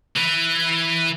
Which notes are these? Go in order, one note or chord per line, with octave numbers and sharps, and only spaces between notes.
E3